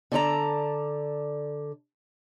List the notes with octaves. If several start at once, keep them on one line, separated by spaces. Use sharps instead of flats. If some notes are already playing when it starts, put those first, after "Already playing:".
D3 A4 D5 A#5